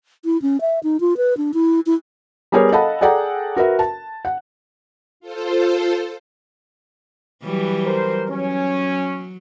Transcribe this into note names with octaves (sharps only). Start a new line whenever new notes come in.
E4
C#4
E5
D#4
F4
B4
D4
E4
E4
G3 B3 G#4 A#4 C#5
A4 D#5 F5 F#5 A5 B5
G#4 A4 D5 F#5 G5 A#5
F#4 A#4 B4 E5
A5
F#5
F4 A4 C5
E3 F#3 G3
A#4 C5
F#3 C#4